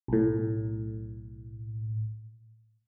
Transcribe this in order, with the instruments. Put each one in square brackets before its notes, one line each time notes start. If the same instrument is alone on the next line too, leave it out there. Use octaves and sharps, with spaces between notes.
[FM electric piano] B1 A2